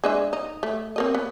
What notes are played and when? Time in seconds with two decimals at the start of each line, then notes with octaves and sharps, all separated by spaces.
0.04 G#3 D4 E5
0.33 D#4
0.63 A3
0.96 C4 A#4 D#5
1.15 B3